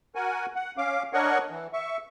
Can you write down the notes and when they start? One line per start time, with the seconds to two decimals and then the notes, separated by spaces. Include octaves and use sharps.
0.15 F#4 A#4 F#5 G#5
0.55 F#5
0.77 C#4 F5 D6
1.13 D4 A#4 C#5 D#5 F#5 C#6
1.50 E3
1.73 E5 C#6